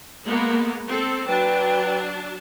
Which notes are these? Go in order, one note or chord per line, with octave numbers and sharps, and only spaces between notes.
G#3 A#3 B3
C4 A4
F#3 D4 B4 G5 A5